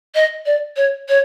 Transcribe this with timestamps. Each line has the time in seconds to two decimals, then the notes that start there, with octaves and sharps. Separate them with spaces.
0.15 D#5
0.46 D5
0.77 C#5
1.09 C#5